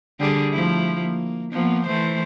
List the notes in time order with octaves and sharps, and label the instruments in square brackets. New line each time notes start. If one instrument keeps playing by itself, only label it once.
[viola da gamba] D3 G3 G#4
F3 A3 E4
A#3
F3 A#3 B3
E3 A3 C5